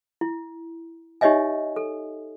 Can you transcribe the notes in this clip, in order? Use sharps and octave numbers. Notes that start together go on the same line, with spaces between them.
E4
D#4 G4 C#5 D#5 E5 G#5
A4